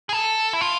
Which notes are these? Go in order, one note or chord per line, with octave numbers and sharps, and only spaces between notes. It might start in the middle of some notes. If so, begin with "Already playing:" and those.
G#4
A4
E4
F4